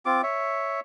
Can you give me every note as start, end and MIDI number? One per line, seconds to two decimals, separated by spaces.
0.06 0.22 60
0.06 0.22 65
0.06 0.22 86
0.23 0.80 73
0.23 0.80 76